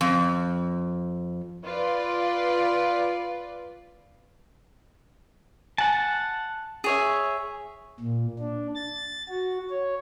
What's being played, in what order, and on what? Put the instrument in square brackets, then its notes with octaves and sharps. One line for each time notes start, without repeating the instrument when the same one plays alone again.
[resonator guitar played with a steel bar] F2
[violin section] F4 B4 D5
[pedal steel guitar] F#5 A5 [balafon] G#5
[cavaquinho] G#4 C#5 E5
[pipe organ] A#2
D4
A6
F#4
C#5